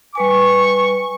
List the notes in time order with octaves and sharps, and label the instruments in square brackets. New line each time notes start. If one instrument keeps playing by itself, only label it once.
[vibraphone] G3 B4 G#5 [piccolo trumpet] C#6